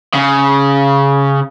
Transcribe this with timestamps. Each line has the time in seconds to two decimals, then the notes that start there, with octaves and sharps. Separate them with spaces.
0.14 C#3